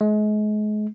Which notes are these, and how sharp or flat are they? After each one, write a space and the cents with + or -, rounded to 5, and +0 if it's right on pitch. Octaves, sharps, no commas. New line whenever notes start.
G#3 +35